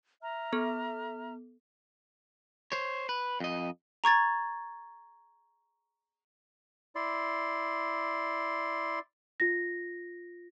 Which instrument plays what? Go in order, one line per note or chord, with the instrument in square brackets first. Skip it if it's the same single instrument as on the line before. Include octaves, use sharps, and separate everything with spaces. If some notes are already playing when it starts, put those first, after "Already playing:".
[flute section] E5 A#5 F6
[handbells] B3 A4
[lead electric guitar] C5 C#5
B4
F2 D#5
[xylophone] A#5 C#6 G#6 A6
[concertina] E4 D5 C6
[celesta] F4 A#6